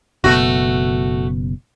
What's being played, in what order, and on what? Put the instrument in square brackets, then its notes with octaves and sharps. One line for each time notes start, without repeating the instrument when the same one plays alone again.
[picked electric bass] F#1 B2 [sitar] A3 F#4